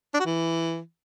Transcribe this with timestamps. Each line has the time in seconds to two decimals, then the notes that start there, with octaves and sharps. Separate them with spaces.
0.14 D4
0.20 F#4
0.26 E3